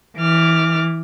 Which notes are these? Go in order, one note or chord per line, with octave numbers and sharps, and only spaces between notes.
E3 D6 F6